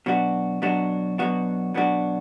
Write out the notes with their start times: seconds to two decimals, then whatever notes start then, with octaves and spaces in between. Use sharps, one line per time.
0.06 B2 F#3 B3 D4 F#4
0.62 B2 F#3 B3 D4 F#4
1.18 B2 F#3 B3 D4 F#4
1.74 B2 F#3 B3 D4 F#4